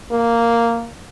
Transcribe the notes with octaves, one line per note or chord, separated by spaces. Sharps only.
A#3